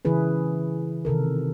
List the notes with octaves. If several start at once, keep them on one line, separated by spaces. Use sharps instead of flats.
C#3 E3 E4 G#4 B4
C3 D#3 A4 A#4